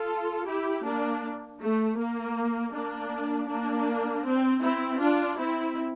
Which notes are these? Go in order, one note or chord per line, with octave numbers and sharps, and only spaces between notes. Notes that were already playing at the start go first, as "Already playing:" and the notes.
Already playing: F4 A4
E4 G4
A#3 D4
A3
A#3
A#3 D4
A#3 D4
C4
C4 E4
D4 F4
C4 E4